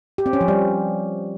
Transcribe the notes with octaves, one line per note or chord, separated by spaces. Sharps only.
G4
C4
C#4
F3
G3